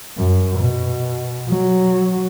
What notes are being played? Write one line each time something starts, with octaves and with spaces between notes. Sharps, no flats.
F#2
B2
F#3